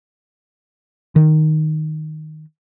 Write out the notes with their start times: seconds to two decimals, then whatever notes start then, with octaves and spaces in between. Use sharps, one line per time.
1.16 D#3